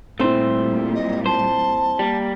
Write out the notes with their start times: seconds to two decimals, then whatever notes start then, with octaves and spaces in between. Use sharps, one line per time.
0.20 A#2 G3 A3 C4 E4 C5
0.95 D#5
1.26 C5 A5
1.99 G3 A#3